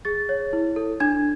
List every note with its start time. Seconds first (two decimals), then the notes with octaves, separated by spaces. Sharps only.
0.05 G#4 A6
0.29 C#5
0.53 E4
0.76 A4
1.00 D4 G#6